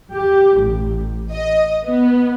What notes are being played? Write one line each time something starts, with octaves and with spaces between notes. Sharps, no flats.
G4
A1
D#5
B3